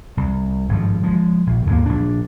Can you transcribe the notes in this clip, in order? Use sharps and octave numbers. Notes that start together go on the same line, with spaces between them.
C2
G#1 G2 F3
F3 G#3
A#1
D#2 G#2 G#3 A#3
A#1 D4